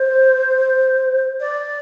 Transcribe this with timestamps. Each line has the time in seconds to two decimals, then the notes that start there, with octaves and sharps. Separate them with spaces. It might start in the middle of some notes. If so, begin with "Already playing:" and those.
Already playing: C5
1.40 D5